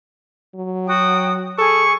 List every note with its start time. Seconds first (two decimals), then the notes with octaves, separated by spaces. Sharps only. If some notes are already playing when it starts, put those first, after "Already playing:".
0.55 F#3
0.87 F#4 G5 D#6
1.58 G#4 A4 C#6